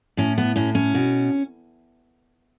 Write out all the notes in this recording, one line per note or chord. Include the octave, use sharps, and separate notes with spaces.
A2 C#4
B3
A2 C#4
C#4
B2